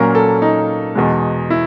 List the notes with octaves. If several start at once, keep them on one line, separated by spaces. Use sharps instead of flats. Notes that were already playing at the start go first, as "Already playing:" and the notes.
Already playing: A#2 F#3 A#3 C#4 A#4
A4
D#4
E2 B2 G#3
E4